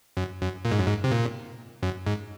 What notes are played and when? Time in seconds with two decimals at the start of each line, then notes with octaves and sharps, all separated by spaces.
0.17 F#2
0.41 F#2
0.65 A#2
0.72 G#2
0.79 F#2
0.86 G#2
1.04 C3
1.11 A#2
1.83 F#2
2.07 G#2